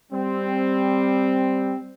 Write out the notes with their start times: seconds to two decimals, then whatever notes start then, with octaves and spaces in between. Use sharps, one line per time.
0.12 G3 C4